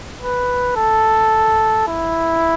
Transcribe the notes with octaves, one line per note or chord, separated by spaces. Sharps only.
B4
A4
E4